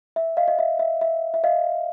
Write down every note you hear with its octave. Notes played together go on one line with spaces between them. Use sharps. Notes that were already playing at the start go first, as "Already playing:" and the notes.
E5
D#5 F5
D#5
E5
E5
E5
E5
D#5 F5